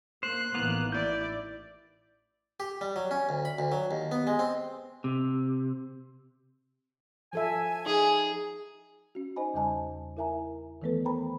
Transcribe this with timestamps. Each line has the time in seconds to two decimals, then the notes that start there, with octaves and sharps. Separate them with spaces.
0.23 A#3 C5 F#6
0.55 A1 D#3 E3 A#3 B3
0.92 E4 D5 G6
2.60 G4
2.81 G3
2.96 F#3
3.11 C#4
3.29 D2
3.45 B5
3.59 D2
3.72 F#3
3.91 D#2
4.12 B3
4.27 G#3
4.39 C4
5.04 C3
7.33 F3 A4 E5 G#5
7.86 D#4 G#4
9.15 C#4 F#4
9.36 D#4 C5 D5 D#5 G#5 B5
9.54 E2 C#3 G3 D#5 G#5 A5
10.17 E4 A#4 E5 G#5 A#5
10.82 D#3 E3 A3 B3 A4 B4
11.05 A#4 C5 G5 A#5 B5